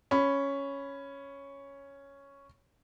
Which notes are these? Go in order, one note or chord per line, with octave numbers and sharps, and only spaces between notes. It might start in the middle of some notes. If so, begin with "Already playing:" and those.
C#4 B5